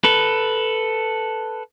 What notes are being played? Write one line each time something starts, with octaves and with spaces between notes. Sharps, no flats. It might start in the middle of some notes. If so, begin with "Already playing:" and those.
A4 B4